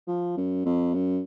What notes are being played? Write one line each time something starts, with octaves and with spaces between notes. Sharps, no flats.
F3
F#2
F2
F#2